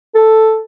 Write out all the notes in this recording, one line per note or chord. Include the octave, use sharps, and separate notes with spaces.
A4